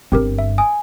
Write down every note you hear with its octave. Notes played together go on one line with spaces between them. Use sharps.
G1 G2 C4 G4 A#4
E5
G#5 D#6